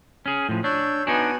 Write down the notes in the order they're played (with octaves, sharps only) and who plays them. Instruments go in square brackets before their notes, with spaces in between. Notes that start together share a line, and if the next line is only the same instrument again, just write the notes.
[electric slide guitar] C#4 G#4
A2 F3
[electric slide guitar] D4 [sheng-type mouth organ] C#5 E6 G6
[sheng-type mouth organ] B3 F#4 G#5 [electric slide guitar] D4 D#4